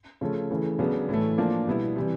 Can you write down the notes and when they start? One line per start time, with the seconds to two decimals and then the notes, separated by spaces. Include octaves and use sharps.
0.21 C#3 F3 A3 C#4
0.51 C#3 E3 A3
0.79 C#3 F#3 B3 D4
1.09 A2 E3 A3
1.38 F3 A#3 D4
1.67 B2 G3 B3 E4
1.96 C3 E3 G3